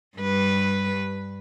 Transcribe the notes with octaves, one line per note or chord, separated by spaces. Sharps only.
G2 G3 B4